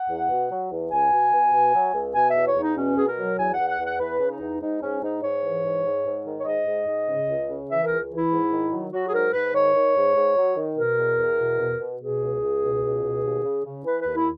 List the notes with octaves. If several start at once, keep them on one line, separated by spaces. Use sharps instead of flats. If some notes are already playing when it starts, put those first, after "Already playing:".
Already playing: F#5
E2
B2
F#3
E2
C#2 G#5
B2
B2
B2
F#3
C#2
B2 G#5
E5
E2
C#5
E2 D#4
B2 C#4
B2 G#4
A#4
F#3
E2 G#5
F#5
E2
F#5
E2
F#5
E2 B4
C#3
D#4
E2
G#2 D#4
G#2 C#4
G#2 D#4
G#2 C#5
E3
G#2
G#2
G#2
D#3
C#5
G#2 D#5
G#2
G#2
C#3
C#2
C#3
E3 E5
A#4
C#2
E3 E4
G#2
D#3
F#3
F#3 F#4
G#4
G#2 A#4
G#2 B4
D#3 C#5
D#3
G#2
G#2
F#3
D#3
B2 A#4
E2
E2
B2
B2
B2
B2 G#4
C#2
C#2
B2
C#2
B2
D#2
C#3
C#3
E3 B4
D#2 B4
E4